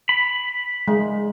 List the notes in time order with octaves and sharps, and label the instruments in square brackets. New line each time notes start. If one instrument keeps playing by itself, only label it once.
[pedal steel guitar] B5
[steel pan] G#3